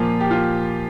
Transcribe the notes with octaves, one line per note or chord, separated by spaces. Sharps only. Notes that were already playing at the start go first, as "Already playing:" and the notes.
Already playing: A#2 F3 A#3 F4
G4
F4